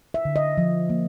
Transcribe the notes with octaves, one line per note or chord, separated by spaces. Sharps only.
E5
D3
D#5
F3
A#3